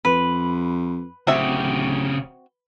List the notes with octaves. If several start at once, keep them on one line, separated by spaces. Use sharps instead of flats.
F2 B4
D1 C#3 C4 F#4 G4 E5